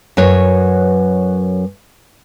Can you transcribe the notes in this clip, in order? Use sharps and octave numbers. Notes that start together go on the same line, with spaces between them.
F#2 F#3 B4 C#5